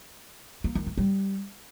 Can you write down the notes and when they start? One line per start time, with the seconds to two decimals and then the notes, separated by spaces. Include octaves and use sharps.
0.64 A#3
0.75 D#3
0.86 A#3
0.98 G3